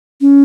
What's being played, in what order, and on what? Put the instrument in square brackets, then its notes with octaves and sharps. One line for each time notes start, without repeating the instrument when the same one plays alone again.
[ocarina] C#4